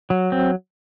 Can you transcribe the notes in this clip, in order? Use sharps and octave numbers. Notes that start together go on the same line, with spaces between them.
F#3
C4